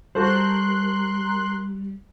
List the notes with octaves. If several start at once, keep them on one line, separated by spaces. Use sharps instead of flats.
G3 F#4 A4 A#4 C5 C6 F#6